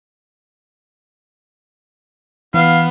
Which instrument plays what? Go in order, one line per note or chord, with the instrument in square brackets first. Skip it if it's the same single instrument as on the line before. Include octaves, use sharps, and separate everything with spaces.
[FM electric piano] E3 [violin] B3 [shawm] F5